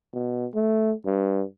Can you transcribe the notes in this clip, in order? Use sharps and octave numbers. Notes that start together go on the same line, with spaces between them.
B2
A3
G2